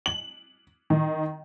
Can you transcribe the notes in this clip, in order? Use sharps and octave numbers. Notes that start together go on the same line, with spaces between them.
F#7
D#3